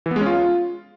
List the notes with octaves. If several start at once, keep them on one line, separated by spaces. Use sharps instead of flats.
E3
B3
G#3
C#4
F4